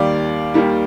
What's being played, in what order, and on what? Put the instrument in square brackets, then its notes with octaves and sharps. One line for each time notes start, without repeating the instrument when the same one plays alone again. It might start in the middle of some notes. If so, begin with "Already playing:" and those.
Already playing: [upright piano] D#2 D#3 G3 D5 F5
D#2 D#3 G3